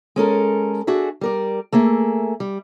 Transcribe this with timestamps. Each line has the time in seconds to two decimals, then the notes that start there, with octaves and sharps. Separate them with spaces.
0.16 G#3 C#4 A4 A#4
0.87 D4 F#4 G#4 E5
1.21 G3 A#4 D5
1.72 A3 A#3 G#4 E5
2.40 G3